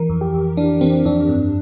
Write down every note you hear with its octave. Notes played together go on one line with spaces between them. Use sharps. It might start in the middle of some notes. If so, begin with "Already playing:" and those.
Already playing: E3 A#4
F2
G4
F2
E3 D4
E3 C4
F2 D4
G2